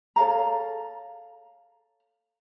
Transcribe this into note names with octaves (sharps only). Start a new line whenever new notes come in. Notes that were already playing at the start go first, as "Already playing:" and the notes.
A4 C#5 F5 A#5